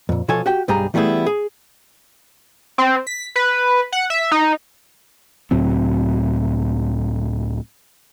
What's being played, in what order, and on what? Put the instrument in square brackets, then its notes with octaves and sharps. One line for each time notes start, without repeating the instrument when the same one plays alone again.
[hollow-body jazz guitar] F2 A#2
B2 F3 A4 C#5 G#5
F#4 G4 G5
B1 G2 G3 G4 G#4 A#5
E3 G3 A3 B3 E4 G#4
G#4
[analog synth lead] C4
B6
B4
F#5
E5
D#4
[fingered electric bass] C#2 A2 F#3 C4